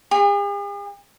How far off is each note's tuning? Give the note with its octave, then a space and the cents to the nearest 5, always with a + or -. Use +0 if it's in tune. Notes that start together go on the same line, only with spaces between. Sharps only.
G#4 -45